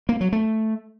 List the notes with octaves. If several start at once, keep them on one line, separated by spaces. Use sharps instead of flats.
A#3
F#3
A3